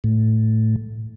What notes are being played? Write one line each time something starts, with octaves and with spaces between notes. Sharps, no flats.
A2